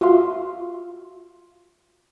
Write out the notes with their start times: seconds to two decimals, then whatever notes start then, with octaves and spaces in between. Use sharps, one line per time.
0.01 F4 F#4 E5 F5 C6